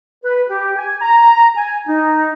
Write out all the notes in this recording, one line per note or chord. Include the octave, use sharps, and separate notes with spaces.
B4
G4
G#5
A#5
G#5
D#4